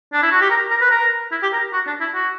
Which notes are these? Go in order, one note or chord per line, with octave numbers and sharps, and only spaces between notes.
D4
E4
F#4
G4
A#4
A#4
B4
A#4
E4
G4
A#4
F#4
D4
E4
F#4